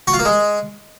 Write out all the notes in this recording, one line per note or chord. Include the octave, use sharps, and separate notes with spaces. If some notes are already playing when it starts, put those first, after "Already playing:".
F#4
F4
A#3
G#3